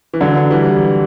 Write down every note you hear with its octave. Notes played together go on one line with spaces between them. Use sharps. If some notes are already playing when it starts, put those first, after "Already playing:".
E3
D3 F#3
E3 G3